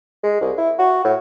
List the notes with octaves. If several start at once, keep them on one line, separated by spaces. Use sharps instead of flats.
G#3
C2
E4
F#4
A2